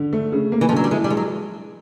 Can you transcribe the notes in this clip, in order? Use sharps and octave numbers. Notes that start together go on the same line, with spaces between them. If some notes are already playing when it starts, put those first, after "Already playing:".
Already playing: D3
A3
C#3
A#3
E3
F3
D3 F#3
G3
G#3 E4
G3
F3 G#3
F#3